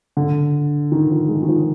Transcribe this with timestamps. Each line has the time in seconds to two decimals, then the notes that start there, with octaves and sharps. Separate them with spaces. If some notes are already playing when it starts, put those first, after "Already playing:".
0.17 D3
0.92 D#3
1.10 F3
1.28 G#3
1.43 D#3
1.48 F3